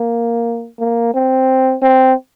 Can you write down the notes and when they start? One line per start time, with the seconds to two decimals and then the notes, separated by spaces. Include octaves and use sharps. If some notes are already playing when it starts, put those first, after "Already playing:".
Already playing: A#3
0.79 A#3
1.14 C4
1.82 C4